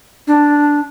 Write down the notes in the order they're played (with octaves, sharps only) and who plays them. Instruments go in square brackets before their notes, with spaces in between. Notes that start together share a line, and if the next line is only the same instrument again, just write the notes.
[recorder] D4